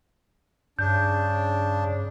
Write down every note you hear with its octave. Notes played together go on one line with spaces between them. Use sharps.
G2 C#3 D4 G6